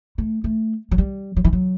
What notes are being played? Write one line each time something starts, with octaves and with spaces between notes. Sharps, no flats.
A3
A3
F#3
G3
F#3
E3
F#3